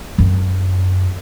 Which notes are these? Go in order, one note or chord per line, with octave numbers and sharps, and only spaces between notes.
F#2 C4